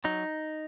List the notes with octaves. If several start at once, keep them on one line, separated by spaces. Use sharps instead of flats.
F#3 D#4